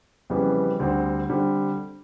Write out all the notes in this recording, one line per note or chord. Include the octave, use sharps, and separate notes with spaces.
F2 C#3 E3 G3 B3
D2 D3 G3 C4
D3 G3 C4